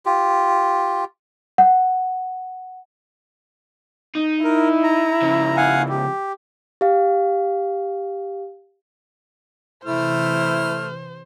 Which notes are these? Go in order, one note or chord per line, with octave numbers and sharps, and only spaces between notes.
F4 G4
F#5
D#4
E4 A#4
A#5
C#3 F3
F5 F#5 G#5
G4
G4 F5
C3 E3 A3 E4 C5 F6